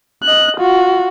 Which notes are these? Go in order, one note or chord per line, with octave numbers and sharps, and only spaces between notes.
D#5 F#6
F4 F#4